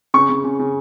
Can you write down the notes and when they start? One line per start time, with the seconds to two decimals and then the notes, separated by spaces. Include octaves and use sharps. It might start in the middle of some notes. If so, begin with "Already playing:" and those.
0.14 C#3 C#6
0.29 C#3
0.44 C#3
0.59 C#3